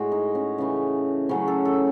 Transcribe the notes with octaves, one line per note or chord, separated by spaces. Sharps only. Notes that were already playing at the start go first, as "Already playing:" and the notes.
Already playing: A2 G#3 F#4
D#4
C#4
C#3 E3 A3
C#3 F#3 A3 C#4
A4
A4